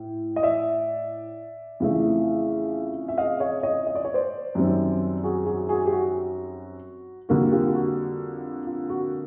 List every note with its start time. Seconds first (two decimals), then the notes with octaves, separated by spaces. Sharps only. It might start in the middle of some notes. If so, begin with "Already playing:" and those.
Already playing: A2
0.36 D#5
0.43 D5 E5
1.80 F2 C#3 E3 A3
3.08 E5
3.18 D#5 F5
3.40 C#5 D#5
3.63 C#5 D#5
3.87 D#5
3.95 D5
4.05 C#5
4.14 C5 D5
4.55 F#2 D#3 G3 C4
5.24 F#4 G#4
5.46 F#4 G#4
5.69 F#4 G#4
5.86 G4
5.92 F#4
7.29 F2 D3 G3 A#3 F#4
7.52 F4 G4
7.75 F#4
8.67 F4
8.90 F#4